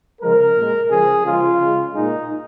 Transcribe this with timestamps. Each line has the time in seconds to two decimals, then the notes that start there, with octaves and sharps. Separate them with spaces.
0.21 C#3 F3 G#3 A#4
0.56 A#2 G#3
0.90 C#3 F3 G#3 G#4
1.25 C#3 F3 G#3 F4
1.60 C#3 G#3
1.94 A#2 G#3 D#4